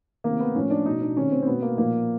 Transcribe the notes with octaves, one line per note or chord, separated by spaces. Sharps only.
C3 D#3 A#3
B3
A2 F3 C#4
D4
B2 D#4
D4
C3 D#3 C#4
C4
C4
B2 B3
A#3
A#2 F3 A#3